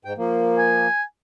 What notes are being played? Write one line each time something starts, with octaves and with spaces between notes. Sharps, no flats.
G#2 G5
F3 A#3
G#5